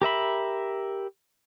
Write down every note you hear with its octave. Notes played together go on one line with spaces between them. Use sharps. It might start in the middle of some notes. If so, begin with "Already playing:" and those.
G4 A#4 E5 B5